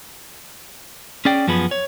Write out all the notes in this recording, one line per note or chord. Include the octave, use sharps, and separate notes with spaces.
C#4 G#4 D5 G5
F#2 F3 B3 G#4 B5
C#5